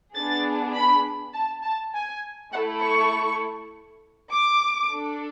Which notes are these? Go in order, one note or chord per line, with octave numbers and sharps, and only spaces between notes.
B3 D4 G#4 A6
B5
A5
A5
G#5
A3 E4 A4 F#5
C#6
D6
D4 A4